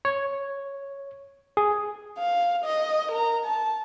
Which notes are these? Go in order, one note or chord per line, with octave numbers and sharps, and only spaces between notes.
C#5
G#4
F5
D#5
A#4 A#5
A5